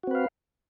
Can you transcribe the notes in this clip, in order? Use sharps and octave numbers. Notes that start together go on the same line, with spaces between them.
C4 F#4 B4 F5